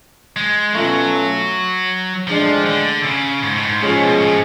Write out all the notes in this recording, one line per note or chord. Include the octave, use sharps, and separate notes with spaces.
G#3
B2 F#3 A3 C#4 F4 A4
A2 F3 G#3 D4
D3
C#3
G#2
A2
G#2
A2 F3 G#3 C#4 G#4 C#5
B2
A2